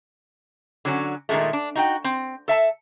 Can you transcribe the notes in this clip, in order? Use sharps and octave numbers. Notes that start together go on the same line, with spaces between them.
D3 F#3 C#4
A#2 D#3 E3 G#3 A3
D4
D#4 F#4 G5
C4
A4 E5 A5